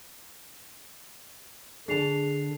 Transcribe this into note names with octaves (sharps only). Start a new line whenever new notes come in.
D3 D4 G#4 A5 C7 F7